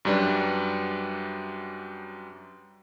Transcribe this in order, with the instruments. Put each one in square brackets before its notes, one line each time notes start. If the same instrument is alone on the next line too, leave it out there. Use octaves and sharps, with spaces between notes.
[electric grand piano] F#2 F#3 G3 D4 B4